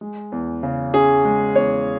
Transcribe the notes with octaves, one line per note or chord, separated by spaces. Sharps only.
G#3
E2
C#3
C#4 G#4
G#3
E2 C#5